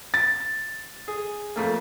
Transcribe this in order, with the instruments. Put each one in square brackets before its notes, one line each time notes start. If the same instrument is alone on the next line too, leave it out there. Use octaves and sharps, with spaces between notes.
[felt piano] A6
[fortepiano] G#4
F2 A3 A#3